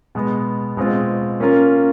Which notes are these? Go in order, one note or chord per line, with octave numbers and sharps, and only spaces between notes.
B2 G#3 B3
B2 G#3 C4 F4
A#3 C#4 F4 A#4